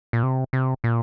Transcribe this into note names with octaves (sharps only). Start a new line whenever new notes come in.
A#2
C3
C3
A#2